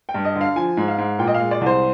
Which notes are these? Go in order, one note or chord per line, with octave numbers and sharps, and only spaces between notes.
G5
G2
D#5
D3
F5
F3 G#5
G#2
F5
G#2
A#2 G5
D#5
F5
G#3
D5
C2
C5